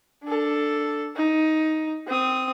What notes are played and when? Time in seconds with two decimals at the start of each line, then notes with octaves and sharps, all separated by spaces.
0.24 D4 A4
1.16 D#4
2.07 C4 D#6